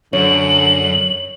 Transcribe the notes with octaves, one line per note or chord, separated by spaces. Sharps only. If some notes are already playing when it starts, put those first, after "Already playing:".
F#2 D3 C#5 F#7